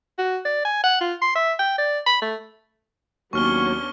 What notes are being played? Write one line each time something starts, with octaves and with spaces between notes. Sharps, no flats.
F#4
D5
G#5
F#5
F4
C6
E5
G5
D5
B5
A3
D#2 F#3 B3 C#4 D4 C#6 F6 G7